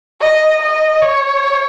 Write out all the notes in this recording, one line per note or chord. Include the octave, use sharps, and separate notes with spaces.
D#5
D#5
C#5